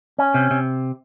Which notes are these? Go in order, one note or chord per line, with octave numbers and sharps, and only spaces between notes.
C#4
C3
C3